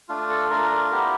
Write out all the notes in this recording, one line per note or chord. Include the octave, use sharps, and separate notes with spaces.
A3 D4 F4
A4
A3 D4 F4 A#4
A#4
B3 E4 G4 A#4